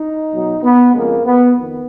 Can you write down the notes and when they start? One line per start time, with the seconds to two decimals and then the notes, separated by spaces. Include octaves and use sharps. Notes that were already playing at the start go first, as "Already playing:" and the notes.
Already playing: D#4
0.32 B2 F#3
0.63 B3
0.94 F2 C#3 G#3 A#3
1.25 B3
1.57 F2 D#3 B3